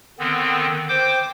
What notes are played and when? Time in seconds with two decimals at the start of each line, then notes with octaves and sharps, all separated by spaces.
0.19 D3 D#3 B3 C4
0.89 C5 G5 D6 G6